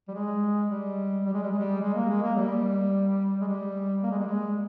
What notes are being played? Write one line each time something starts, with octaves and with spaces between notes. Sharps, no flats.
G3
G#3
G3
G3
G#3
G3
G#3
G3
G#3
A#3
G#3
A#3
G3
G#3
G3
A#3
G#3
G3
G#3